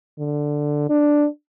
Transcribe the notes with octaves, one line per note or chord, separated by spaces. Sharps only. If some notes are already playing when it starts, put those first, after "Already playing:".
D3
D4